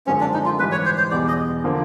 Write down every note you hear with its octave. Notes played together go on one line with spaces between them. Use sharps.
F#2 D3 F3 G#3 C4 C#4
D4
D#4
F4
G#2 E3 G3 B4
C#5
C5
C5
E2 B2 G3 D5
D#5
D3 F3 A#3